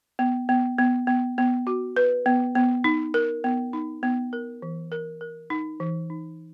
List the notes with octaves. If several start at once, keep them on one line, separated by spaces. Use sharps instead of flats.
B3
B3
B3
B3
B3
F#4
B4
B3
B3
D#4
A#4
B3
D#4
B3
A#4
E3
A#4
A#4
D#4
E3
D#4